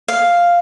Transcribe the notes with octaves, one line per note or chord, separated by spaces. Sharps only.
F5